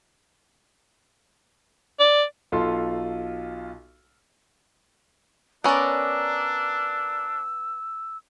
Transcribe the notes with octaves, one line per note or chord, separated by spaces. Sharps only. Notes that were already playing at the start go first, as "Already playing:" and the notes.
D5
B1 F4 A4 C6
B3 C#4 D4 A#4 D5 E6